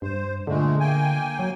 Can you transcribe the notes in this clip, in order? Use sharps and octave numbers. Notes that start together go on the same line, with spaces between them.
G2 C5
A#2 D3 G#3 A3
A#3 G5 G#5
F#3